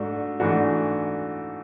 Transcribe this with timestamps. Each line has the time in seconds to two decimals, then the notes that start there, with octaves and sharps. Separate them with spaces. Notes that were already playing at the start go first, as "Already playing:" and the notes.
Already playing: G#2 A3 D4 F#4
0.40 G#2 E3 A3 D4 F#4